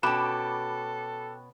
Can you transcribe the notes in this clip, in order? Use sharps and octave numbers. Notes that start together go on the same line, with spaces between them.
B2 C#4 A4 G5 B5 D6 F#6 E7